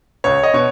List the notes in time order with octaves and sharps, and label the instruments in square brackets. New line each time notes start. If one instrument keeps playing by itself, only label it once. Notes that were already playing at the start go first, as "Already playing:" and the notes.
[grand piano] C#2 C#5
D#5
B2 C#5